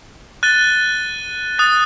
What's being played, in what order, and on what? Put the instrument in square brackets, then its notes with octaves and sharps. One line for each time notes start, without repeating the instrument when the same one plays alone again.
[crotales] F#6 A6 D#7 G7
D#6 F#6 A6